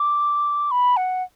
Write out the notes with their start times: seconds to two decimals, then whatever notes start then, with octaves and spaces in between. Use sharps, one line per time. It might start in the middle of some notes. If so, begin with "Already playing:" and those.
Already playing: D6
0.71 B5
0.97 F#5